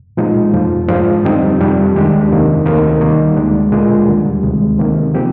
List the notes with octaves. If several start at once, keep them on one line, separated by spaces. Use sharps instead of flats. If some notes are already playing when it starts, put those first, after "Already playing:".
A#2 F3 G#3 D#4
F2 C3 F3
G#2 F3 G#3 D4 F4
F2 D3 G3 C4 D#4
F2 C3 G3 D4
D#2 D#3 G#3 D4 G4
F2 C3 D#3 A#3
D2 C3 D#3 A#3
D#3 G3 A#3
D2 D3 G#3 D4
A#2 G#3 D4 F4 A#4
D#2 D3 G3
D2 C3 D#3 G#3
C3 D#3 A#3
F3 C4 G4